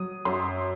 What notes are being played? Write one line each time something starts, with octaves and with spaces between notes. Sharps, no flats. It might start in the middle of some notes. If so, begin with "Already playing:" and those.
Already playing: F#3 D#6
F#2 C6